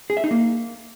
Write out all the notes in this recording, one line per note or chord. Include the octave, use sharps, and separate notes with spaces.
G#4
E5
D#4
A#3